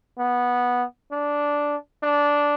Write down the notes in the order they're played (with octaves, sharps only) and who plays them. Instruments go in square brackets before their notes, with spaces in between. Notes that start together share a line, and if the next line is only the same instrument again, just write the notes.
[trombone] B3
D4
D4